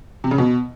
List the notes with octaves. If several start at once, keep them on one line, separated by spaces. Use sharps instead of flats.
C3
C#3
B2